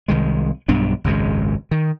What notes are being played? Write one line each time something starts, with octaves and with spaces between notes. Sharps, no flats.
C2 D#3 G#3
B1 G2 B3 D4
G#1 C#2 F#2 G#3
D#3